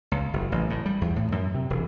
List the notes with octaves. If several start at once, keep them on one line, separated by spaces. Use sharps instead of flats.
C#2
F#1
A1
A2
G3
E2
A2
F#2
C3
E1